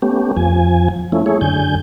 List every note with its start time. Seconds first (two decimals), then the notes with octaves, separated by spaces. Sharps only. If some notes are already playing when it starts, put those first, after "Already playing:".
0.02 A3 B3 C#4 G4
0.37 F2 F3 G#5
1.12 F3 A3 C#4 E4
1.26 A3 E4 G#4 C#5
1.41 F#2 D3 G#5 G6